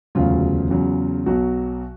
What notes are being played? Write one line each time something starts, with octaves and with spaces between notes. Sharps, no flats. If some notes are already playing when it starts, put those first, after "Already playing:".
E1 D2 C#3 F#3 F4
E2 C#3 F#3
B1 B2 F#3 F#4